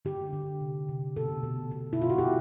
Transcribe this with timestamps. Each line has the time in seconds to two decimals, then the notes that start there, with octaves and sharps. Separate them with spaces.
0.05 D3 G4
0.33 D3
0.61 C3
0.89 C3
1.16 B2 A4
1.43 B2
1.71 B2
1.93 E4
1.99 B2 F4
2.10 F#4
2.18 G4